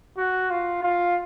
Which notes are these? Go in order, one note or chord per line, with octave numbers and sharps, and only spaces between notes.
F#4
F4
F4